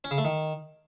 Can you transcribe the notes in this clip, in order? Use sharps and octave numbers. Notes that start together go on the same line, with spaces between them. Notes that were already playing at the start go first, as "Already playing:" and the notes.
C#4
C#3
A3
D#3